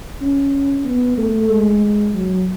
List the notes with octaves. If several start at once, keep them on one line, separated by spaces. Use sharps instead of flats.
C#4
B3
A3
G#3
F#3